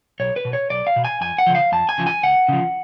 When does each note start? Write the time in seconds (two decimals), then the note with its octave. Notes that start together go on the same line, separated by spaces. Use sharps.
0.20 B1 C#5
0.36 B4
0.45 B2
0.53 C#5
0.70 B1 D5
0.87 F5
0.96 B2
1.05 G#5
1.21 F2 G#5
1.38 F#5
1.47 C#3 F3
1.55 F5
1.72 F2 A5
1.89 G#5
1.98 C#3 F3
2.07 G#5
2.23 C#2 F#5
2.49 C#3 F3